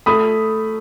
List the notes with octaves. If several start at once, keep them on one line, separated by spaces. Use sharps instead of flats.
A3 B5 D#6